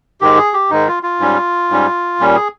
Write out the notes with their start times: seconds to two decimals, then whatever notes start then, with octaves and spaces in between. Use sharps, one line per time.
0.21 G#2 D#3 G#3 G4
0.38 G#4
0.54 G4
0.70 G#2 D#3 G#3 D#4
0.88 F4
1.03 F4
1.20 G#2 G3 C#4
1.70 G#2 G3 C#4
2.20 A#2 G3 C#4
2.35 G#4